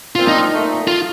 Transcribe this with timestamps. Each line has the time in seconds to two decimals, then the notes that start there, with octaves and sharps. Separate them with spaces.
0.15 A#2 F3 C4 F4
0.28 D#4
0.52 A#2 A3 D#4
0.88 F4